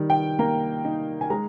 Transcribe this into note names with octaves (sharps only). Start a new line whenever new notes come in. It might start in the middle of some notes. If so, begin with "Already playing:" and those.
Already playing: D#3 G3
G5
A#3 A#5
D#4
G#5
G#3 A#5